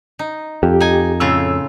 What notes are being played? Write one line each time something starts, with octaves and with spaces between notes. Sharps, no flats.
D#4
F2 G4
D#4 G#5
A2 C#3 F4 E6